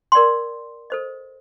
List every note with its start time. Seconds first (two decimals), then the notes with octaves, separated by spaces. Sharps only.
0.12 A#4 D5 G5 C6
0.90 A4 C5 D#5